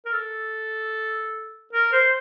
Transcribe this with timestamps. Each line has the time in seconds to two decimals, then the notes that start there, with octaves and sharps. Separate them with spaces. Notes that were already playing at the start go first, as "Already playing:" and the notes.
0.06 A#4
0.13 A4
1.73 A#4
1.93 C5